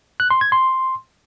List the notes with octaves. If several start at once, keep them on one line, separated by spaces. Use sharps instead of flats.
F#6
C6
G#6
C6